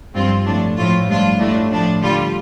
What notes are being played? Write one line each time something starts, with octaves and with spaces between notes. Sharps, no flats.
G2 F3 C4 F4
A2 F3 D4
A2 F3 A3 F4
G2 F3 D4 F4
A2 A3 D4
A2 F3 D4
D3 G3 F4